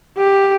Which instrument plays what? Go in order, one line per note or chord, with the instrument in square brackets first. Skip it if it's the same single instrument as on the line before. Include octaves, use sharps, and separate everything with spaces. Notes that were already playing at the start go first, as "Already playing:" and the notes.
[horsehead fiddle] G4